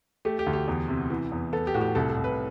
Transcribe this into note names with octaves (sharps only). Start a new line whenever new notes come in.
A3 G4
G4
D2
G4
E2
C3
E3
E2
B3 A4
G4
A2 F#4
G4
C2 A4
A4
C2
B4